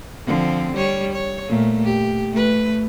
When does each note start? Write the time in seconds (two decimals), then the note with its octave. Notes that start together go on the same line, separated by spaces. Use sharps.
0.27 D3 F3 C4
0.74 G3 C#5
1.13 C#5
1.48 A#2 A3
1.84 G4
2.31 A3 B4